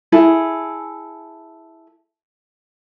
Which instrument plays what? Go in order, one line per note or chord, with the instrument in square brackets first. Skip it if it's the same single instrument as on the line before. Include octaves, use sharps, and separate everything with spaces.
[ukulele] E4 G#4 A4